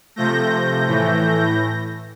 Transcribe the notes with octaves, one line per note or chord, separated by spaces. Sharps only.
C3 F3 A3 G6 A#6
A2 E3 A3